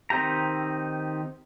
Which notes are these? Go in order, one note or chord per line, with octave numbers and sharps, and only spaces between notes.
D#3 C4 D#4 G4 A#5